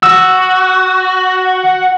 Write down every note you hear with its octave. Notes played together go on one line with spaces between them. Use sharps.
F#4 E6